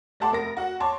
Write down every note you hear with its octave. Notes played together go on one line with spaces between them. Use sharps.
A3 G4 F#5 A5 C6 D6
F1 A#4 A#6
F#4 F#5
C#5 A5 C6 D6